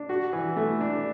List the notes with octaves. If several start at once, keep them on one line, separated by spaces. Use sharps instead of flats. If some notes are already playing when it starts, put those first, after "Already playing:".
Already playing: D4
F#4
E3
A3
D4